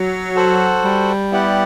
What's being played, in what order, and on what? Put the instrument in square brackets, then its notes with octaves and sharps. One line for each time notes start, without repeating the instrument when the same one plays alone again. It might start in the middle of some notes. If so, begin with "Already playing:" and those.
Already playing: [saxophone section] F#3
[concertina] F#4 A4 C5 F#5
[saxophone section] G3
[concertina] B3 E4 G4 D5 F#5